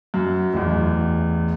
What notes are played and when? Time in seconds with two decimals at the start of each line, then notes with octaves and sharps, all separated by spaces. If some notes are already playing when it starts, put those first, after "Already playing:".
0.14 F#2
0.54 A1 E2